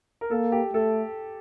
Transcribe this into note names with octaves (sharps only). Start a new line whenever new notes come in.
A#4
A#3 A4
G4
A3 A4